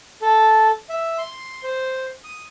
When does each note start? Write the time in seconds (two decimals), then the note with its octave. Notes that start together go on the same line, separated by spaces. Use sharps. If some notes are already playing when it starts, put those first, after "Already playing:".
0.22 A4
0.89 E5
1.18 C6
1.63 C5
2.24 D#6